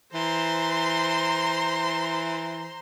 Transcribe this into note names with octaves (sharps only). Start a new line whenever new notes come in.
E3 C5 A#5 C6